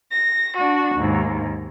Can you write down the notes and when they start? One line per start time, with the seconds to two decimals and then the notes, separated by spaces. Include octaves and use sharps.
0.11 A#6
0.57 D4 F#4
0.96 D#2 G#2